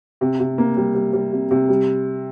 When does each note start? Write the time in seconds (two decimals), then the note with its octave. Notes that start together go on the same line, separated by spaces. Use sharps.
0.21 C3
0.39 C3
0.58 A#3
0.77 G3
0.95 G3
1.13 G3
1.32 C3
1.51 C3
1.69 G3